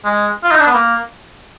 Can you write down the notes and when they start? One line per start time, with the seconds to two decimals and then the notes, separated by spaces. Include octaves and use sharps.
0.05 G#3
0.44 F4
0.51 D#4
0.59 D4
0.67 B3
0.74 A#3